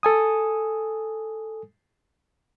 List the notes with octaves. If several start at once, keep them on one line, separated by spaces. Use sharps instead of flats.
A4 G#5 D#6